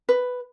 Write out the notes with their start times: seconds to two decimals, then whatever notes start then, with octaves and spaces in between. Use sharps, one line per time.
0.09 B4